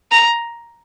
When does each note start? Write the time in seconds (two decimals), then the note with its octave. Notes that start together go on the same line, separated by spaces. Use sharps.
0.11 A#5